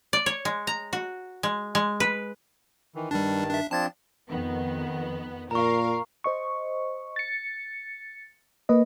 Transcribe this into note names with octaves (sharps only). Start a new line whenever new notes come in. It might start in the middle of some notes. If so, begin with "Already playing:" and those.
D5
C#5
G#3
A#5
F#4
G#3
G#3
B4
D#3 E3
G2 D#3 G3 D4 A5
D4 E5
F3 C4 D4 A5 G#6 A6
F2 D#3 B3
A#2 A#4 F5 A#5 C#6
C5 D#5 C#6
A6 C#7
A#3 B4 D#5